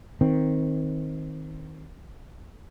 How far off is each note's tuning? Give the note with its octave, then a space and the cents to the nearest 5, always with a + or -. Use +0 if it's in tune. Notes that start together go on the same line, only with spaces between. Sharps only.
D#3 +10 C4 +0